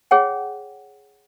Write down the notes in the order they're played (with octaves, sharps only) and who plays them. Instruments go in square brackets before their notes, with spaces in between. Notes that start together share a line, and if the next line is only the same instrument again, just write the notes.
[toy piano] G#4 C#5 F#5 G5